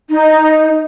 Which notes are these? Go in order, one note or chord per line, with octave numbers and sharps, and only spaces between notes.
D#4